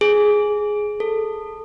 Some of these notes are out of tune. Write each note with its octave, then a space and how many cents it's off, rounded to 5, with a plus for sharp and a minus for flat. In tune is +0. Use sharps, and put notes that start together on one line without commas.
G#4 +5
A4 +15